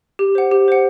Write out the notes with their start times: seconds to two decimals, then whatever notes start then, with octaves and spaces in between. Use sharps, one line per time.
0.19 G4
0.35 C5 F#5
0.52 G4
0.68 C5 F#5